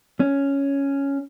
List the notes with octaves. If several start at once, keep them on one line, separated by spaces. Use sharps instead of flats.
C#4